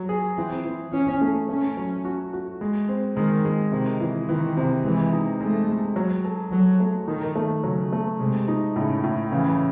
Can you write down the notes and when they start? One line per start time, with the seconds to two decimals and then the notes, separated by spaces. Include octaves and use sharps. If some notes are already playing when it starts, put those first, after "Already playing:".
Already playing: F#3
0.09 G#4
0.37 E3 C4
0.65 E3
0.93 E3 C#4
1.21 A3
1.49 A3 C#4
1.77 F#3
2.05 F#4
2.33 F#4
2.61 G#3
2.89 C4
3.16 D#3 G#3
3.45 G#3
3.72 C3 D#3
4.01 E3
4.29 D#3 E3
4.57 C3
4.84 E3 G#3
5.13 D#4
5.40 G#3 A3
5.69 G#3
5.96 F#3
6.25 A4
6.52 F#3 A4
6.80 A3
7.08 D#3 D#4
7.35 A3
7.63 C#3 F#3
7.92 A3
8.20 C3 G#3
8.48 D#4
8.76 A2 C#3
9.04 A2
9.31 C#3 E3